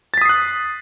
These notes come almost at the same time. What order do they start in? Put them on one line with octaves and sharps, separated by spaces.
A6 B6 D#6 C7 F#6